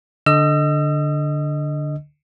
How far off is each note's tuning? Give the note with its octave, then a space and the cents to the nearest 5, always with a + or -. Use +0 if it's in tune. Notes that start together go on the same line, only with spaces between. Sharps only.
D3 +0 D#5 +0 E6 +35